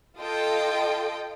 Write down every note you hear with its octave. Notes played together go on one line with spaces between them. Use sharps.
F4 A4 D#5 G5